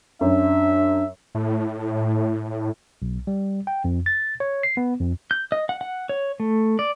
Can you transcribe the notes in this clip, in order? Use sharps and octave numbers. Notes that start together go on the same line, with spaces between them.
F#2 D4 E5
A2
B1
G3
G5
F2
A6
C#5
C7
B3
F2
G6
D#5
F#5
F#5
C#5
A3
D5